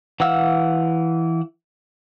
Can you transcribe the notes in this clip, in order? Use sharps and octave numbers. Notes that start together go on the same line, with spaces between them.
E3 F5 F#5 E6 F6